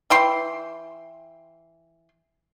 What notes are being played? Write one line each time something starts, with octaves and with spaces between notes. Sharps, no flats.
E3 G5 C6